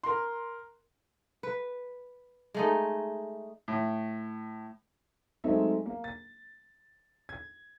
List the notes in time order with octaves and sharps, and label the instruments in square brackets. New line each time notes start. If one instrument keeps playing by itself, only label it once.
[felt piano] A#4 C6
[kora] B4
G#3 A3 D#4
[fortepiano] A2
[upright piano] F#3 G#3 A3 C4 D#4 E5
A#3
A6
G#6